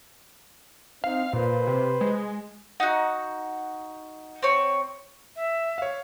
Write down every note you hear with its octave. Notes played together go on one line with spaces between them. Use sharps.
C4 D#4 F5
A#2 B4 C5
C3
G#3
D#4 F#4 F#5
C4 C#5
E5
C#5 F5